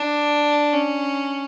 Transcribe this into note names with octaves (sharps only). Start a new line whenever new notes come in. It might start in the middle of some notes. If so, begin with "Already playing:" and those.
Already playing: D4
C#4